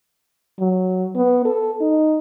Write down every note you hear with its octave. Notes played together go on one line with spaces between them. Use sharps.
F#3
B3
A4
D#4